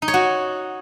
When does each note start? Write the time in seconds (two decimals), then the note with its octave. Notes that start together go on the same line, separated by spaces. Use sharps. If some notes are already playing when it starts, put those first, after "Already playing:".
0.02 D#4
0.08 C#5
0.14 F#4